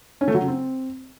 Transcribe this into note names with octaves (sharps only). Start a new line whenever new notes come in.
C#4
A3
F#3
C#3
C4